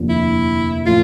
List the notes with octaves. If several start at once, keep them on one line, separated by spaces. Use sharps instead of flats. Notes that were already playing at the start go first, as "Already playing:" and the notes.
Already playing: F1 D#2 D3 F3
E4
A2 E3 A3 C#4 F4